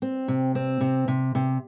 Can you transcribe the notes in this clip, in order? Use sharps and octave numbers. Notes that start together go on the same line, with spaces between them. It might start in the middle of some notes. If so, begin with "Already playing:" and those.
C4
C3
C4
C3
C3
C3